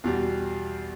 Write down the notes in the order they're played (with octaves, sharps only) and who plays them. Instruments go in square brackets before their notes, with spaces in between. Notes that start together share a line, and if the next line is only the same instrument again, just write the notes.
[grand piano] E2 B2 G3